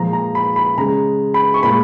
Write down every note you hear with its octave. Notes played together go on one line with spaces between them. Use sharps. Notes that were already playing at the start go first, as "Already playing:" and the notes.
Already playing: A#2 F3 G#3 A#5
A#5
B5
B5
C#3 G#3 A#5
B5
C#6
A#2 G#3 B5